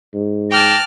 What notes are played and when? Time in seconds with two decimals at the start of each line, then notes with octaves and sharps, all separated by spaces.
0.14 G#2
0.51 G5 A5 D6 F6 F#6 A#6